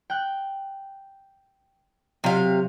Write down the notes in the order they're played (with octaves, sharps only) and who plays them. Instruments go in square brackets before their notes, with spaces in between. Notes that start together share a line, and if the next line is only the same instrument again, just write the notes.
[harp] G5 F#6
[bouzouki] C3 F5 [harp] F#3 F4